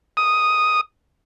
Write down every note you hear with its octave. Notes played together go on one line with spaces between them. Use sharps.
D#6